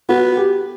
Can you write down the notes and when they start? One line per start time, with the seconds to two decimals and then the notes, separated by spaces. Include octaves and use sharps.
0.09 B3 F#4
0.37 G4